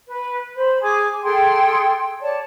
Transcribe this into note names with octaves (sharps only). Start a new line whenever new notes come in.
B4
C5 B5
G#4 G#5 D6
G#4 A4 G5 C6
C#5 D5 A5